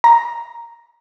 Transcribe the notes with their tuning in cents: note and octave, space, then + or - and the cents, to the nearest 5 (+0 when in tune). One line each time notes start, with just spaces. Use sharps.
A#5 +0